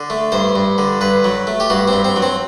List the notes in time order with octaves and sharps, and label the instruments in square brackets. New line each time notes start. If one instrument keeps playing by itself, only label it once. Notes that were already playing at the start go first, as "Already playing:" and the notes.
Already playing: [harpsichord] D3
A3
G2 C5
G2
D3
G2 B4
F#3
A3
G4
G2 F#4
C4
G2
C4
F#3
C4